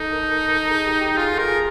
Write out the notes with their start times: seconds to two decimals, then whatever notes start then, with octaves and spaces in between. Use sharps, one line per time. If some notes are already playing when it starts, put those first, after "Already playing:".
Already playing: D#4 A4
0.12 A#4
0.23 A4
0.49 A#4
0.55 A4
0.70 G#4
0.87 G4
1.01 G4
1.17 F4 G#4
1.33 A4 A#4
1.48 G#4